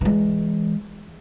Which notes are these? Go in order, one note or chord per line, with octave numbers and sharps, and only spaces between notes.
E3 G#3